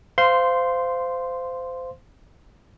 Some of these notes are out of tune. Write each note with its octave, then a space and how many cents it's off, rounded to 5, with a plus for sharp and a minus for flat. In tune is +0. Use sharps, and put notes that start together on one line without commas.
C5 -20 F5 -10 C6 -5